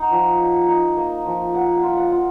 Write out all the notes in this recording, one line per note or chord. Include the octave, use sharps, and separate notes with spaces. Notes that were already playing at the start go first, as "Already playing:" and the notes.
Already playing: D#4 F#5
F3
D#4
D#4
A#3
F3
A#3 F#5
F5
F4
F#5
F4